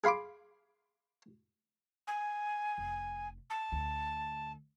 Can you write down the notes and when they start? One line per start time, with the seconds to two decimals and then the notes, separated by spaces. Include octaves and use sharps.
0.04 G#4 F5 B5 C6 D6
2.07 G#5
2.78 F1
3.50 A5
3.72 D2